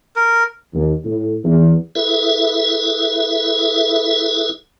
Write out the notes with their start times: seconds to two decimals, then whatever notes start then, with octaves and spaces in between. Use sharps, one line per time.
0.16 A#4
0.75 D#2
1.05 A2
1.45 E2
1.95 E4 G#4 A4 B4 E5